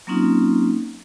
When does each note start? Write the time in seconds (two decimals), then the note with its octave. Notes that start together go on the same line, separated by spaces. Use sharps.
0.07 F#3 A#3 C4 C#4 D#4 F4